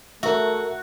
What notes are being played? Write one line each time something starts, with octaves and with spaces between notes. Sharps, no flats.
A3 F#4 A#4 E5